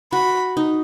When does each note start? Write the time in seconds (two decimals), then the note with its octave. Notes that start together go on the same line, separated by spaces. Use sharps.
0.12 F#4 B5
0.57 D#4